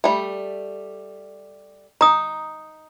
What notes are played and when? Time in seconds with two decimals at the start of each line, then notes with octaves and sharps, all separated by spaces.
0.04 G3 A3
2.01 D#4 A#5 D#6